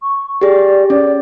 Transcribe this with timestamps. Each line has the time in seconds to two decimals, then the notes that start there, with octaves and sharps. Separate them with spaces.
0.02 C#6
0.42 G4 G#4 D5
0.90 C#4 D5